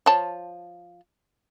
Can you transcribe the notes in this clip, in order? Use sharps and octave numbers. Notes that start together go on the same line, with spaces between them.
F3 C#5 A5